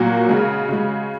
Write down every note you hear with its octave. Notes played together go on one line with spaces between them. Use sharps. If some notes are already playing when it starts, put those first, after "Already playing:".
Already playing: A#2 F#3 A#3 F#4
C#3 G#3
C#3 G#3